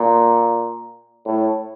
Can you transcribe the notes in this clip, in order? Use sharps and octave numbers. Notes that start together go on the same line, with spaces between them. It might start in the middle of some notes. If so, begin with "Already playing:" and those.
Already playing: A#2
A2